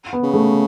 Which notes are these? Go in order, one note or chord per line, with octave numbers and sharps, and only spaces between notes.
B3
C#3
A3